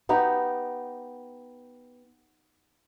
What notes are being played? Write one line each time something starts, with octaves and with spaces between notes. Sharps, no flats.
B3 D#4 G4